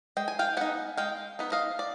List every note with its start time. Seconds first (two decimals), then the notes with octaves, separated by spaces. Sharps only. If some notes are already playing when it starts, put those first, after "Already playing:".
0.17 G#3 G5
0.28 G#5
0.39 F5 G5
0.57 B3 D#4 F#5 G#5
0.97 G#3 F5 G5
1.39 B3 D#4
1.52 D#5 F5
1.79 D5